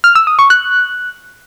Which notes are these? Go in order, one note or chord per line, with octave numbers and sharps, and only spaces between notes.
F6
E6
D#6
C#6
F#6